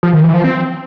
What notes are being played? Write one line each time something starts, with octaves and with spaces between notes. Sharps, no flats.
F3
D#3
E3
F3
C4